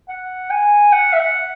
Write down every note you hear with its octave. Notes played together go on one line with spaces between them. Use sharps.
F#5
G#5
F#5
E5
F#5